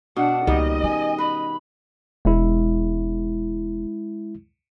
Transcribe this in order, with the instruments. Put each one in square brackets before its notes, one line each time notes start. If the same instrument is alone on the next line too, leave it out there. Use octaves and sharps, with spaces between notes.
[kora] B2 [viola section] D4 [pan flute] F#5
[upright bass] C#2 A#3 [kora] D#3 G3 [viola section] D#5
[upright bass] C#4 [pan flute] G#5
[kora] B4 [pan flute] B5
[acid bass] E1 [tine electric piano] G#3 E4